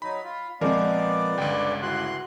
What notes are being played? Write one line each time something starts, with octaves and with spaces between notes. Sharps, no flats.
F#3 D#4 B5
F4
A#2 F3 G#3 B3 C4 A#4 D5
G1 C#2 D3 G5
E3 F#4 C6 F#6